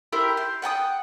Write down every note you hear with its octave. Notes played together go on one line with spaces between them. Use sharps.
E4 G4 A#4 C5
C5
F#5 G5 A5 D#6